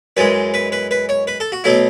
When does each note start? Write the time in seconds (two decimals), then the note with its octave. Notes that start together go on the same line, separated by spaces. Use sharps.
0.17 F#2 E3 G#3 B4
0.54 B4
0.72 B4
0.91 B4
1.09 C#5
1.27 B4
1.40 A4
1.52 F#4
1.64 B2 F#3 A3 E4